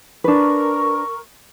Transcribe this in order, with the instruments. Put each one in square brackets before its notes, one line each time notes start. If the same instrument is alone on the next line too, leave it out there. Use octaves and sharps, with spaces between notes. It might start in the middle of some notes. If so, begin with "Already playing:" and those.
[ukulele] D4 B4 [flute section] A#4 C#6